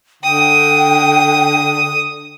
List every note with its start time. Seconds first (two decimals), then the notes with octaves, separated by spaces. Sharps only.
0.23 D3 G5 D#6